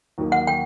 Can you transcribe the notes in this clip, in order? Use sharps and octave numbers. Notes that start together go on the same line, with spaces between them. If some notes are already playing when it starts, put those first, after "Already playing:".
D#2 D#3 F#3 A#3
F#5
G5